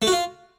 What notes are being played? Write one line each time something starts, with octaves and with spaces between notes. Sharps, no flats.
A3
F#4
F4